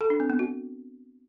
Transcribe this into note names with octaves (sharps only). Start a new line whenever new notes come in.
A4
D4
C4
B3
F#4